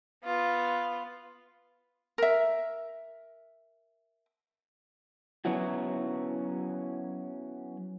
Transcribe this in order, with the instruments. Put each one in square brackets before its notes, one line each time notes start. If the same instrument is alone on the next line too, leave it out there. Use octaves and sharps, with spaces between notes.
[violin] B3 F4
[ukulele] A#4 E5
[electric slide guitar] F#3 B3 C#4 E4 F#4